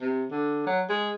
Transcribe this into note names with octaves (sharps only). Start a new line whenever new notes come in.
C3
D3
F#3
G#3